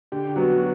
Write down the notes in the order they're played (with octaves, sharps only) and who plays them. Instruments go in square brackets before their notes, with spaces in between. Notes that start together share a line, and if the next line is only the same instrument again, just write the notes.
[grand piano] D3 [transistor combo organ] G4
[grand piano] F#3 B3 [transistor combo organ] F#4